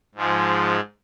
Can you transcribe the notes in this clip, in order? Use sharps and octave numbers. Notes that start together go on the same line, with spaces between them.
G#2 F3 G#3